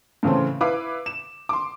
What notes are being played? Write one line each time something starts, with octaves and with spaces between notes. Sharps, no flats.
A2 C#3 E3 A3 C4
E4 B4 F5 D6
E7
C6 D6